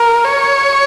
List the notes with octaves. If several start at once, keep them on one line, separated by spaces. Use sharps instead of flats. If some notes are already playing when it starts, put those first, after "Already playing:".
Already playing: A#4
C#5